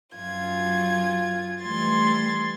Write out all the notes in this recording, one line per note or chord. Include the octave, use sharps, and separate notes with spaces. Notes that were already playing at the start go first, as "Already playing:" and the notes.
F#2 F4 G#6
E3 G3 A3 C6 G#6 A6